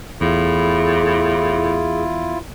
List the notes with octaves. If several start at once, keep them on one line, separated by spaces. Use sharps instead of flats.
E2 A2 E4 F4 G#4